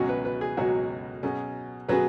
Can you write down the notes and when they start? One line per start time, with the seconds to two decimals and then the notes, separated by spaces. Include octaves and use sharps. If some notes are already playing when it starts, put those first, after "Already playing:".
Already playing: C#2 B2 F#3 C#4 F#4
0.09 B4
0.25 B4
0.41 G#4
0.57 C#2 B2 F#3 C#4 F#4
1.23 B2 F#3 C#4 G#4
1.88 B2 F#3 C#4 G#4 B4